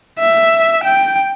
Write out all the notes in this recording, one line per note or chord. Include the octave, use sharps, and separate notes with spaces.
E5
G5